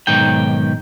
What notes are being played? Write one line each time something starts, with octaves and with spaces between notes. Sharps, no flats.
B1 G#2 D#3 G5